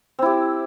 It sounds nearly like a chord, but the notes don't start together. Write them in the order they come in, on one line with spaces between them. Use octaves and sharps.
C4 E4 G4